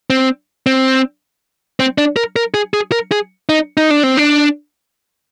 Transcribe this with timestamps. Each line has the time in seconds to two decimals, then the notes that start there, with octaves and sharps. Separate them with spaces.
0.10 C4
0.66 C4
1.80 C4
1.98 D4
2.16 A#4
2.36 A#4
2.54 G#4
2.74 G#4
2.92 A#4
3.12 G#4
3.49 D#4
3.77 D#4
3.90 D4
4.03 C4
4.17 D4